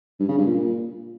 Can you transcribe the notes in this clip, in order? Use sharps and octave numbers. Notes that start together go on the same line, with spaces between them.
G2
C#3
G2
A#2